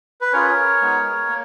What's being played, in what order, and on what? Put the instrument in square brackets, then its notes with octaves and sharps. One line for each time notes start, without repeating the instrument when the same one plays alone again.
[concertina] B4
C#4 F4 G#4 A#4 C#5
G#3 B3 D#4 G#4
A#3